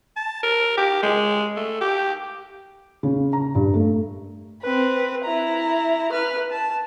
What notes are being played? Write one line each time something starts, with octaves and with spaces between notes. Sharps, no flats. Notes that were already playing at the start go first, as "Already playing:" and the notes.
A5
A#4
G4
G#3
A3
G4
C#3
A#5
G2
A3
C4 B4
E4 A#5
B4 F6
A5